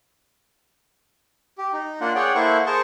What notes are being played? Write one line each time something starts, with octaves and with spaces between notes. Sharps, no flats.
G4
D#4
A#3 D4 F4 F#5
G#4 C#5 D5 F#5 G5
A#3 E4 A4 C5 F#5 C#6
G#4 A#4 C5 A5 C6 C#6